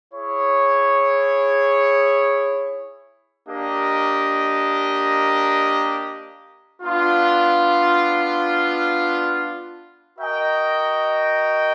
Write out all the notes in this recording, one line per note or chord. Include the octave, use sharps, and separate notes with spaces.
E4 G#4 C#5
A#3 D4 G4 A#4 D#5
B3 D4 F4
F#4 A#4 D#5 G5